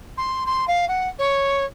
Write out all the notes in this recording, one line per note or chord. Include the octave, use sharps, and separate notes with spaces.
C6
C6
F5
F#5
C#5